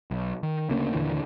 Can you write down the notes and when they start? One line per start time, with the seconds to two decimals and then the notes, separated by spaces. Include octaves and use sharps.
0.11 B1
0.43 D#3
0.70 D2 C#3 A#3 C#4
0.94 D#2 A#2 D3 E3